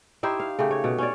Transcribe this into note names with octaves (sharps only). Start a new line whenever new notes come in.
D#4 E4 G4 C5
F5
C#3 A3 G4
C#5
B2
C#4 C#5 D5